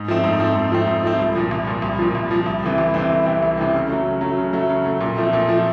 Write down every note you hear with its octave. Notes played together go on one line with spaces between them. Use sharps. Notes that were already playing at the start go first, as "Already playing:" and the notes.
Already playing: G#2
F3 A3 C4
G#2
F3 A3 C4
G#2
F3 A3 C4
G#2
F3 A3 C4
C2
A#2 F3
C2
A#2 F3
C2
A#2 F3
C2
A#2 F3
C2
C3 E3 A3 C4
C2
C3 E3 A3 C4
C2
C3 E3 A3 C4
C2
C3 E3 A3 C4
C#3
F#3 A3
C#3
F#3 A3
C#3
F#3 A3
C#3
F#3 A3
A#2
F3 A3 C4
A#2
F3 A3 C4